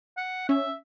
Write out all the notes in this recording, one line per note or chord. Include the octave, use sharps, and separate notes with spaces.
F#5
C#4 E5